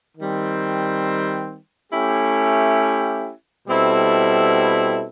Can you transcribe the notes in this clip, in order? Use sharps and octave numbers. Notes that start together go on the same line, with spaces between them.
D#3 G3 C4
A3 C#4 E4 G4
B2 G3 C4 E4 A4